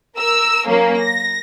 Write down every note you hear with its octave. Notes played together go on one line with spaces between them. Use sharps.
A#4 E6
F#3 A#3 C#4
A#6